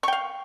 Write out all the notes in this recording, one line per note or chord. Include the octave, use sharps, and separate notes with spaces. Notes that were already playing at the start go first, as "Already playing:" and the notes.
F5 G5 C#6